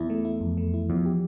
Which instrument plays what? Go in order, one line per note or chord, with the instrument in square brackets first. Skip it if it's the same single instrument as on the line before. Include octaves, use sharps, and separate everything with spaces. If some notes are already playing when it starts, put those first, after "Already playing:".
Already playing: [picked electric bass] E2 [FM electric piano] E4
[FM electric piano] A3
E4
F2
A3
E4
[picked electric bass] E2 [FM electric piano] F3
[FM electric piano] G4